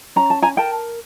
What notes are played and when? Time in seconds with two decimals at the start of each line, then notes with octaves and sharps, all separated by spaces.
0.16 C#4 A#5
0.30 A5
0.42 G#5 A#5
0.57 A#4 G5 A5